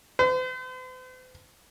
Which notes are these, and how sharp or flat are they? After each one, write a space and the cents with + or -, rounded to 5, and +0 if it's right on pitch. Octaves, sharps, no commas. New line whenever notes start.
C5 -45